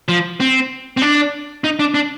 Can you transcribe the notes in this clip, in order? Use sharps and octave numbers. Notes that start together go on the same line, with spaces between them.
F3
C4
C4
D4
D#4
D4
D4